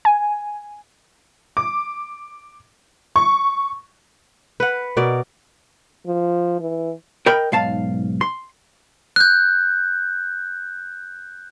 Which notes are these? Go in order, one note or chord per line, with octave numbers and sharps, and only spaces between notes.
G#5
D6
C#6
B4 F#5
B2 A#4 D5
F3
E3
A#4 D#5 G5 B5
B1 G#2 F5 A5
C6
F#6 G6